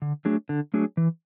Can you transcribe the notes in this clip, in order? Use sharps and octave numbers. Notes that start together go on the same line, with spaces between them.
D3
F#3 A3 D4 G#4
D3
F#3 A3 D4 G#4
E3